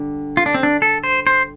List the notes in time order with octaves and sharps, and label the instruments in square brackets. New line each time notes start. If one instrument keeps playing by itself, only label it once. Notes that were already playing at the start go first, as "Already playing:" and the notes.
Already playing: [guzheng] D3 G3
[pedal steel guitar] F4
D4
C4
D4
A4
C5
C5